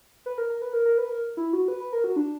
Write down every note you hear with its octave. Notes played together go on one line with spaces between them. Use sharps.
B4
A#4
A#4
B4
A#4
A#4
B4
A#4
E4
F#4
B4
B4
A#4
F#4
D4